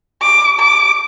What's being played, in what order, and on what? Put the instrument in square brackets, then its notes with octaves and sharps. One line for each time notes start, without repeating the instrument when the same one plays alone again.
[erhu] D6
D6